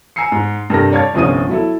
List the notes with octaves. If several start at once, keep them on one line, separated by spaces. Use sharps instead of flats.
G#5 A#5 E6 C7 C#7
G#2
G2 C3 A4 A#4 A#6
C#5 D5 F5 A5 G#6 A6
G1 C2 F3 C#4 D#6 D#7
F#3 E4 A4